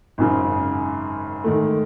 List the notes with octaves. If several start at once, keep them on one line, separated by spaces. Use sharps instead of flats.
G#1 F#2 C#3
G#2 D#3 A3